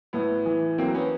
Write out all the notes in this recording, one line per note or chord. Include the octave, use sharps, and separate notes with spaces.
A2 B3
E3
F#3 A#3 C4
B3 C#4